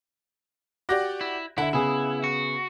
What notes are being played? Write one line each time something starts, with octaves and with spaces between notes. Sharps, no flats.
F#4 G4 D5 D6 F#6 A#6
E4
D3 E4 E5 F#5
C#3 B3 E4 G#4
F#4